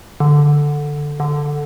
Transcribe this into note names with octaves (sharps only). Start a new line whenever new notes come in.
D3
D3